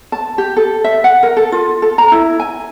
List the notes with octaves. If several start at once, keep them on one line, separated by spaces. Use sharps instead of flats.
A5
G4
A4
E5
F#5
A#4
A4
F4
A4
A#5
E4
G#5